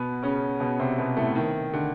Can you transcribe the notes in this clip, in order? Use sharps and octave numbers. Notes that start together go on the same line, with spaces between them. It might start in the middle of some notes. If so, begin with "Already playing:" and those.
Already playing: B2 B3
C#3 C#4
B2 B3
C3 C4
B2 B3
A2 A3
D#3
D3